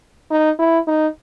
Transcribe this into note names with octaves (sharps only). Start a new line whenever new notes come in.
D#4
E4
D#4